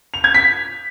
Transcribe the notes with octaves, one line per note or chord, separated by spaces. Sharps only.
F7
G#6
B6